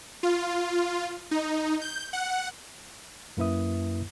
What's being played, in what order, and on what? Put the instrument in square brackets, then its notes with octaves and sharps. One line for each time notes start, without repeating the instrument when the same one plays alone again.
[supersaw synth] F4
D#4
G6
F#5
[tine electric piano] F#2 A#3 E4 B4 E5 D#6